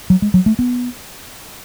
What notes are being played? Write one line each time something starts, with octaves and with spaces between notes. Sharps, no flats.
F#3
G#3
F#3
A3
B3